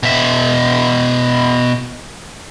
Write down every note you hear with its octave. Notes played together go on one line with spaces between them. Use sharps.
B2 E5